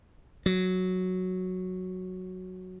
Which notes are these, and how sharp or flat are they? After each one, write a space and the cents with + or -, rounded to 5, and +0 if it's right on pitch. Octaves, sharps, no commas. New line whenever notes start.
F#3 -5